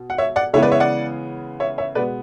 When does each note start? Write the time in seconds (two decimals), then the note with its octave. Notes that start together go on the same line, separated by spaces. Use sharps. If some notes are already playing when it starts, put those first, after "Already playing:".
Already playing: B2
0.10 F#5
0.18 C#5 E5
0.36 D5 F#5
0.53 C#3 E3 G#3 B3 C#5 E5
0.62 B4 D5
0.71 C#5 E5
0.80 D5 F#5
1.60 C#5 E5
1.78 C#5 E5
1.95 B2 G#3 B3 B4 D5